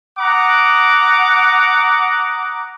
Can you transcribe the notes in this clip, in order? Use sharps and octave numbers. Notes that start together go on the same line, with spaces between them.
F#5 A#5 D6 D#6